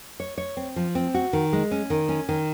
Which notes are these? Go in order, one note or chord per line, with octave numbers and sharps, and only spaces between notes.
C#5
C#5
C4
F3
C4
F#4
D#3
G#3
C#4
D#3
C#4
D#3